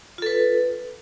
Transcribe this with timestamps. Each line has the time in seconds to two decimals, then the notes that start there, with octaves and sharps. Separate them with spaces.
0.18 F4
0.22 A4
0.26 B4